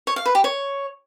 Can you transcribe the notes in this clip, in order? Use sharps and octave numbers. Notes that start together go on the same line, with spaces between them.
C#5
F5
B4
G4
C#5